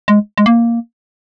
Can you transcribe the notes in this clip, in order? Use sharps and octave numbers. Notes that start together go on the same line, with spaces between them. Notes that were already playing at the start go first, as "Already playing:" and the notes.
G#3
G#3
A#3